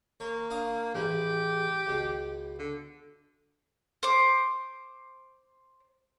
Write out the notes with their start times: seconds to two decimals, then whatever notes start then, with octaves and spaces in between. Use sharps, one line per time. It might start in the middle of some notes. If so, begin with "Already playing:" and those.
0.20 A#3 C#5
0.50 D4 F5 D#6
0.95 A1 G#3 B3 G4
1.87 C#2 B2
2.59 D3
4.03 C5 D6